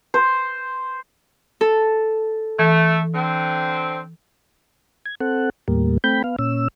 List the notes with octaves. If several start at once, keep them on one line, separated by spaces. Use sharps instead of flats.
C5
A4
E3 A3
D3 C4
G#6
C4 A4 F#5
D#2 A2 G3 A#3
A3 C4 G5 B5 G6
B3 F5
A#2 C#4 E6